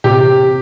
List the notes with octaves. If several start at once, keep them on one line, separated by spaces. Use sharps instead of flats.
C3 G4